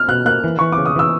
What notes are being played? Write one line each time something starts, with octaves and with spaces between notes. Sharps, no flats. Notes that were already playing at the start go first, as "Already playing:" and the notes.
Already playing: F6
B2 F#6
A#3 F#6
E3
E3 C#6
D6
C#3
D#6
E3 E6